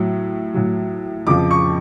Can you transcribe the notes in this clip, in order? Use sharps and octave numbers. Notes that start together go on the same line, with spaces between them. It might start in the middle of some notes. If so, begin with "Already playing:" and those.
Already playing: A2 F#3
A2 F#3
F2 C#3 F3 D6
C#6